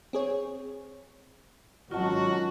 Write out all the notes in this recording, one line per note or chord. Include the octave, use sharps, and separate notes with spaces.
C4 G#4 C#5
G#1 F#3 C#4 F4 F#4 D#5 A5